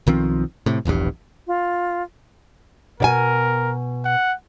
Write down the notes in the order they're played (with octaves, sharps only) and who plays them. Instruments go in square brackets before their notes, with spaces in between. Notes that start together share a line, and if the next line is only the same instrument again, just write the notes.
[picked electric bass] B1 D#3 F3 C4
A2 C3
E1 A#1 E2 G2
[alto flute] F4
[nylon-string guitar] B2 D5 G#5 [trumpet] A#4
[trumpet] F#5